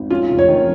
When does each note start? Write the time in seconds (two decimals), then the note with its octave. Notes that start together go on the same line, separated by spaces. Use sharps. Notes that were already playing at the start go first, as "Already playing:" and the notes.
Already playing: G#1
0.10 C#4 F4
0.30 F1
0.39 C#5
0.48 D#3